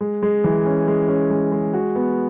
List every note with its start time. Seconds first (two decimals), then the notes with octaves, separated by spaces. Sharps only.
0.01 G#3
0.23 G#3
0.44 E3
0.66 C#4
0.88 G#3
1.08 C#4
1.30 G#3
1.52 G#3
1.73 F#4
1.95 B3